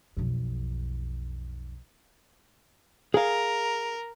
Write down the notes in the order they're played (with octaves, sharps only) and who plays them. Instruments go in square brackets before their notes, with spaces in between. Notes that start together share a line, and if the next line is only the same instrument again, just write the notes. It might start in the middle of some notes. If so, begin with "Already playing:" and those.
[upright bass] B1 F2
[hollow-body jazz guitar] G#4 F5 [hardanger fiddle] A#4